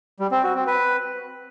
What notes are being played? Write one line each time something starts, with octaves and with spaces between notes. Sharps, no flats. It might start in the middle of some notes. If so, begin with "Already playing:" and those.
G3
C4
F#4
C4
B4